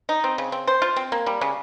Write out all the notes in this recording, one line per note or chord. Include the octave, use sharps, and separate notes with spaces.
D#4
C4
C#3
C4
C5
F4
C4
A#3
G3
C#3